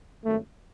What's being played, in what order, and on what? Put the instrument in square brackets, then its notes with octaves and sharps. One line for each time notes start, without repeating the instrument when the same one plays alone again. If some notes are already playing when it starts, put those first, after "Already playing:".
[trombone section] G#1 F#2 D#3 A3